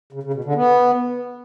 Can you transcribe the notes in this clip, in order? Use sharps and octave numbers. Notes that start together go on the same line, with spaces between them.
C#3
C#3
B2
D3
B3